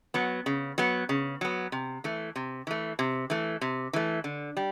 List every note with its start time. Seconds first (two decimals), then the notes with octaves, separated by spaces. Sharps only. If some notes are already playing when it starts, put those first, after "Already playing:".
0.14 F#3 B3
0.46 C#3
0.78 F#3 B3
1.09 C#3
1.41 F#3 B3
1.72 C3
2.04 E3 A3
2.36 C3
2.67 E3 A3
2.99 C3
3.30 E3 A3
3.61 C3
3.93 E3 A3
4.24 D3
4.57 G3